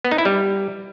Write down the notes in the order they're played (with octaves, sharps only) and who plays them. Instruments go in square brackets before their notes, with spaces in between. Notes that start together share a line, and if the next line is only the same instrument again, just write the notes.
[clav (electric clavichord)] B3
D#4
E4
G3